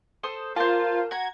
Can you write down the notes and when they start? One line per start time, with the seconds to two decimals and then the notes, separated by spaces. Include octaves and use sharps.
0.23 A4 C5 D#6
0.56 F4 A#4 C5 A5
1.11 F#4 F#5 A#5 G#6